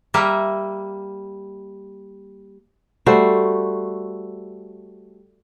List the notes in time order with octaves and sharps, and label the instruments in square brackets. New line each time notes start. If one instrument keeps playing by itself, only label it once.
[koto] G3 A#3 E5
[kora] G3 A3 F#4 C5